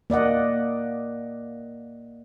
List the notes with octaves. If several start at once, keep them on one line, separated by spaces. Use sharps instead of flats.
A#3 D5 D#5 F#5